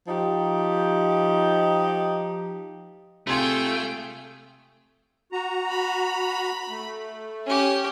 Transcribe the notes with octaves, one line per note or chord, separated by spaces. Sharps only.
F3 D#4 G4
C3 A3 F4 G#4 G5 C6 G#6
F#4 A#5
B5
A3
C#4 G4